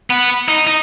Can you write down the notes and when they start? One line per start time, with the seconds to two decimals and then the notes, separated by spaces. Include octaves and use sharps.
0.10 B3
0.48 D#4
0.67 D#4